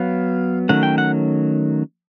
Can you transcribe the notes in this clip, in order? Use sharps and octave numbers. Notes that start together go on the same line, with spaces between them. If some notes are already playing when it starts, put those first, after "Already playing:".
Already playing: F#3 B3 F5
D#3 F#3 A3 C#4 F#5
G5
F#5